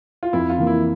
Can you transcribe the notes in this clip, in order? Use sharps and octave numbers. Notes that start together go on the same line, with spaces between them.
F4
F2 E4
F4
E3 A#3
E4